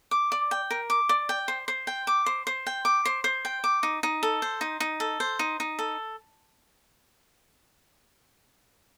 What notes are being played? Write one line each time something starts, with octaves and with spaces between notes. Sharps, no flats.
D6
D5
G5
A#4
D6
D5
G5
C5
C5
G5
D6
C5
C5
G5
D6
C5
C5
G5
D6
D#4
D#4
A4
C5
D#4
D#4
A4
C5
D#4
D#4
A4